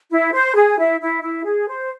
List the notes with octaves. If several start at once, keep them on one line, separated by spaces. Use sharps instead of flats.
E4
C5
G#4
E4
E4
E4
G#4
C5